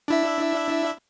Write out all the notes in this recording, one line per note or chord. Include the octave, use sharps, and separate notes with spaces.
D4 E4 E5